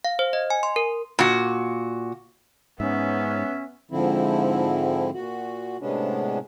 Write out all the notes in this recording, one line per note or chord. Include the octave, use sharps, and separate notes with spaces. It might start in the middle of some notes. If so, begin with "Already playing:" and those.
F5
C5
D#5
G#5
C6
A#4
A#2 F#4
G#2 B3 C#4 E5
G#2 D3 F3 C4 E4
A#2 F#4
A2 C3 G#3 B3 C#4 D4